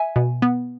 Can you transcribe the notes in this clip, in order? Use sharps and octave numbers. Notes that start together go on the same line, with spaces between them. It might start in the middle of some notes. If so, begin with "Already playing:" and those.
Already playing: E5 G#5
B2
B3